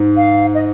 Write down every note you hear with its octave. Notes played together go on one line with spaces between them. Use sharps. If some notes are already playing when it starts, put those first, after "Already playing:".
Already playing: G#2
F5
D#5